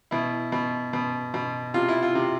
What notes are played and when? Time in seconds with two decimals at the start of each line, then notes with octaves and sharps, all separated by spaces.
0.11 B2 E4
0.52 B2
0.93 B2
1.34 B2
1.74 C3 F4
1.88 E4
2.03 F4
2.15 C3